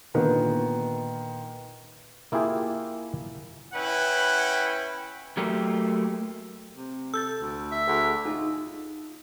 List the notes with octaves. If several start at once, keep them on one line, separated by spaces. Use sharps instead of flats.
A#2 D3 D#3 B3
A#3 E4 F4 G4 G#4
C#4 E4 B4 F#5 G5
F#3 A3 A#3 G4
C3
A4 E6 G6 A6
D2
E5
D2 G#4 A4 F#5
D#4 F4 G#4